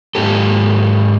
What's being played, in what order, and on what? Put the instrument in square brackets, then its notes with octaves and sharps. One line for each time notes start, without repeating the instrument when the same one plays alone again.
[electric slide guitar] G#2 G4 A4